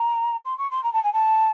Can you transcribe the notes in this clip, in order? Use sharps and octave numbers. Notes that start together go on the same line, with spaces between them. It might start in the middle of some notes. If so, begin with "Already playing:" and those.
Already playing: A#5
C6
C#6
C6
A#5
A5
G#5
A5